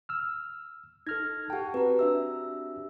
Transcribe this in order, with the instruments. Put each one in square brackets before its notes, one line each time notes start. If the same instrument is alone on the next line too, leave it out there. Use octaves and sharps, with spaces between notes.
[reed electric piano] E6 F6
[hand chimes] D#4 A#6 [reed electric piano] A4 F6 G#6
[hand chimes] G4 A5 [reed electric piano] F#5 G5
[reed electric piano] C4 F#4 G4 [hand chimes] B4 A#5
[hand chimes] D4 E5 E6